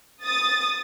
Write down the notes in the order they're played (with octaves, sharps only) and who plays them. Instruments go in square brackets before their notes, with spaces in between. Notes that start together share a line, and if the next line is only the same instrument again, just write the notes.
[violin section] D#6 A6